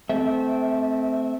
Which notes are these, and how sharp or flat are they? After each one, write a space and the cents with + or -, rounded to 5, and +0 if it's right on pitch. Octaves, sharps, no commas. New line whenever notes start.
A3 -20 C4 -20 E5 -20